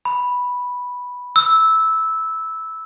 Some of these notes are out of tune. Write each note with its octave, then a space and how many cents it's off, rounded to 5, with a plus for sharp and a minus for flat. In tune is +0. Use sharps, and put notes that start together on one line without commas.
B5 -5
E6 -10